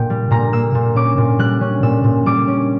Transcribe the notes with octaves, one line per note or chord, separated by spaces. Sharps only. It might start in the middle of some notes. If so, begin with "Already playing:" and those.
Already playing: A#2 A#3 G5
G3
A#2 A#5
A#3 E6
A#2
C#4 D6
A#2
G3 F#6
C#4
A#2 E6
A#2
G3 D6
C#4